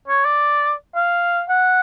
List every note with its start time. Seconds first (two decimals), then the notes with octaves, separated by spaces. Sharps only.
0.08 C#5
0.25 D5
0.95 F5
1.49 F#5